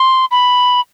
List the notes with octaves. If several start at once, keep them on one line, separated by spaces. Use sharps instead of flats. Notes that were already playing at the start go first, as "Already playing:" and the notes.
Already playing: C6
B5